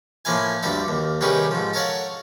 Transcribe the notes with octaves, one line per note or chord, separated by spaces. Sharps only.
A2 F3 A#3 E4 F5 G#5
D2 G2 D3 G3 A4 E5
D#2
C2 D#3 C#4 G4 G#4 B4
G#2 F3
A4 A#4 C#5 F5 F#5